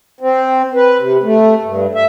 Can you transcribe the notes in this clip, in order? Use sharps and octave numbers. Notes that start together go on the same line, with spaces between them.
C4
B4
C3
A3
G2
E5